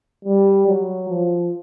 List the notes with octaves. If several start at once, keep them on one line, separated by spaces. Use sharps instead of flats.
G3
F#3
F3